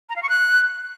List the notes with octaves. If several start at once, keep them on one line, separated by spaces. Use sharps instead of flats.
A#5
F5
C#6
F#6